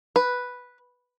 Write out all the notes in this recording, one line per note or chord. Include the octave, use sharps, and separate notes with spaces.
B4